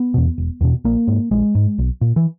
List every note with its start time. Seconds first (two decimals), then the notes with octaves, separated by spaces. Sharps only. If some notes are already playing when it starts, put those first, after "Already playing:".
Already playing: B3
0.14 E2 B2
0.38 E1
0.61 E2 B2
0.84 A#1 A#3
1.07 G#2
1.31 A#1 G#3
1.55 G#2
1.79 B1
2.01 A#2
2.16 E3